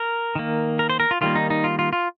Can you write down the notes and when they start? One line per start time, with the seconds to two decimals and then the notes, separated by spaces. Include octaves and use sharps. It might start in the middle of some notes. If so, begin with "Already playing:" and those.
Already playing: A#4
0.36 D#3 A#3
0.79 A#4
0.90 C5
1.00 A#4
1.11 F4
1.21 D#3 G3 A#3 F4
1.36 D#4
1.50 D#4
1.64 F4
1.79 F4
1.93 F4